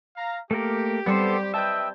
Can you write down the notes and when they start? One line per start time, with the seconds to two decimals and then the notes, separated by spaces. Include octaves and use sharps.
0.16 F5 A#5
0.51 A3 A#3 G4 A#4
1.06 G3 B3 C4 A4 C5
1.54 B4 D#5 E5 G5 A5 G6